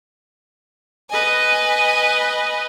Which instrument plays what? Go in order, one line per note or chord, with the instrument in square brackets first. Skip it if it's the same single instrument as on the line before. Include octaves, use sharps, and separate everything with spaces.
[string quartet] B4 D#5 G#5